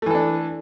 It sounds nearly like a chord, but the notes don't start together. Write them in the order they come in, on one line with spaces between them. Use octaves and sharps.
A3 E3 A4 D4